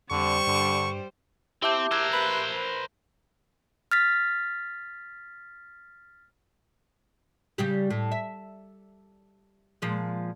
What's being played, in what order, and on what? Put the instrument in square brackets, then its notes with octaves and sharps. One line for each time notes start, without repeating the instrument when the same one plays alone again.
[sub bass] F2 [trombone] D3 [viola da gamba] G3 C5 [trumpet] C#6
[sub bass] G2 [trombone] D3
[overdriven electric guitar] C4 [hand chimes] E4 D6 G6 [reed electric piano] G4 E5 A5
[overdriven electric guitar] A#4 C5 [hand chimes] E6 F#6 G#6
[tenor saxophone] B4
B4
[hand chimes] F6 A6 B6
[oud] C#3 G3 G4
A2
E5
A#2 F3 G#3